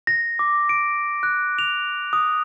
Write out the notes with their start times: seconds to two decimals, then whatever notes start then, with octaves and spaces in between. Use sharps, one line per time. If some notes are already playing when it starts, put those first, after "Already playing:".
0.07 A#6
0.39 D6
0.69 D7
1.23 F#6
1.59 F7
2.13 D#6